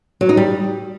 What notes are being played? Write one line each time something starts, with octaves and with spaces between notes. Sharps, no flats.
F#3
D#4
G3